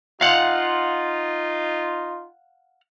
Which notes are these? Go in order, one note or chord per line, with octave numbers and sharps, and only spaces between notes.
D#4 F4 F5 F#5